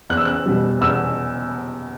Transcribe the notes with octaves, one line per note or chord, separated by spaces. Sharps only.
E2 F#6
E6
F#6
B2 G3
E2 E6